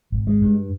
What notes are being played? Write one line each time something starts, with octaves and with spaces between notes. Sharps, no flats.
G#1
G#3
G2